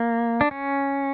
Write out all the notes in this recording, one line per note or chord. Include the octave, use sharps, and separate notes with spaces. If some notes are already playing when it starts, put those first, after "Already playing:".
Already playing: A#3
D4
C#4